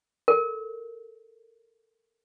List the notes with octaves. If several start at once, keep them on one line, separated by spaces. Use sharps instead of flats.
A4 A#4